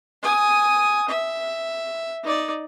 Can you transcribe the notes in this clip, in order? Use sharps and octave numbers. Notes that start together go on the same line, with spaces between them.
G#5 D#6
E5
D#4 D5